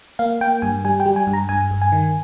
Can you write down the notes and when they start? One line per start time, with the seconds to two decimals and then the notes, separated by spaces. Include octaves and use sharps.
0.19 A#3 F5
0.41 A#3 G5
0.62 G2 G#5
0.85 G3 G#5
1.00 G5
1.06 G3
1.16 G#5
1.27 G2
1.33 A#5
1.49 G2 G#5
1.71 G2
1.82 G#5
1.92 D#3